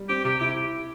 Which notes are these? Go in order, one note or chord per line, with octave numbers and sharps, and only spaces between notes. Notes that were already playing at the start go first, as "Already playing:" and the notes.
Already playing: G3
C4 G4
C3 G4
E4 G4